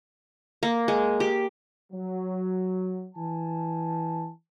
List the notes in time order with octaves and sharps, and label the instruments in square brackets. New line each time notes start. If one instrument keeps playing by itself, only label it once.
[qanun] A#3
G#3
G4
[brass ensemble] F#3
E3 G#5 A5